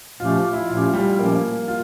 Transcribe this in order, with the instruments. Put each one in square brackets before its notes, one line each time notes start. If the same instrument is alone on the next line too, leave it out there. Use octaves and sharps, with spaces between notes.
[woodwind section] A#2 F3 A3 C#4 G4 [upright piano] F4
[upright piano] E4
[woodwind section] A#2 F3 A3 C#4 G4 [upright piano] F4
[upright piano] G3
[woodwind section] A#2 F3 A3 C#4 G4 [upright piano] A#3
[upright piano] F4